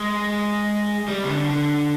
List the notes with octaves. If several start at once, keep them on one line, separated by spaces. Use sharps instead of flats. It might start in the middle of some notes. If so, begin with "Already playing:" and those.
Already playing: G#3
G3
C#3
D3
D3